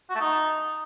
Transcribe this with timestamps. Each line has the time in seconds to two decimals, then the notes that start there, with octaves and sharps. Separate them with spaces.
0.10 F#4
0.15 A3
0.20 D#4